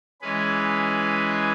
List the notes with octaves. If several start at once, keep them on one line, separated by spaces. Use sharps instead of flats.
E3 G#3 C#4 G#4 B4